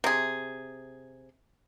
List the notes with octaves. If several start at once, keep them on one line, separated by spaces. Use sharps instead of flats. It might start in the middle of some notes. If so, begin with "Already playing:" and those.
C3 G#4